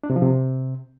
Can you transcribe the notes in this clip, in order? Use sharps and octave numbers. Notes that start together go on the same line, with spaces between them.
D4
C3
F3
C3